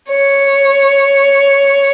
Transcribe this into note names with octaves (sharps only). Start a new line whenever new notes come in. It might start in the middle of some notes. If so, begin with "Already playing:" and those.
C#5